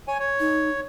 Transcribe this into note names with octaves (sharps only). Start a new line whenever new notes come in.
C#5 G#5
C#5
D#4